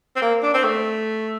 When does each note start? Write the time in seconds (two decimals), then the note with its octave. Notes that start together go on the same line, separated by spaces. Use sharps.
0.16 C4
0.22 A#3
0.43 D4
0.54 C4
0.64 A3